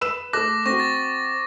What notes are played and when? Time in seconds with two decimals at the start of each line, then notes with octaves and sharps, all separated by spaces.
0.01 B4 E6 E7
0.33 A3 D6 F#6 A#6
0.66 C4 F#4 C#6 A#6
0.80 A6